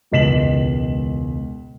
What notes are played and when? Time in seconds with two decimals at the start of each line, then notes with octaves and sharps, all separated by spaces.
0.11 E1 C#2 D#5 B6 E7 F#7